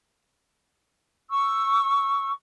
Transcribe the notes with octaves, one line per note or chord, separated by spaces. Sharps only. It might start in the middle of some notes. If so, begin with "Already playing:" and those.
C#6 E6